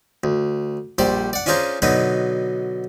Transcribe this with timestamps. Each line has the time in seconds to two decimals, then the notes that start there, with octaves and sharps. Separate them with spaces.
0.24 D2
0.98 A#1 G3 C5 D5
1.33 D5 F#5
1.46 C#4 D4 F4 G#4 C5 A#5
1.82 B2 D3 F#3 D#4 B4